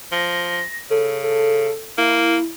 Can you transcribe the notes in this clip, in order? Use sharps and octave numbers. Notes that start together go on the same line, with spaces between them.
F3 A#6
C#3 A4
A4
A#3 E4